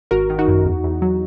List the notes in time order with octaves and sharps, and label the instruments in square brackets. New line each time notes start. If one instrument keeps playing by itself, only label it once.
[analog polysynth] G#1 F#4 A#4
D#3
D#4 F#4
F#2
E2
E2
F#3